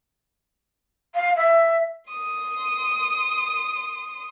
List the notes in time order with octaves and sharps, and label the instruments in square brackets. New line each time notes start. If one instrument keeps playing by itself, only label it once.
[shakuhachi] F5
E5
[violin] C6 D#6